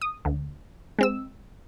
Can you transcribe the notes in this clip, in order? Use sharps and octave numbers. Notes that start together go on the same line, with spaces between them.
D#6
D2
G#3 C4 E6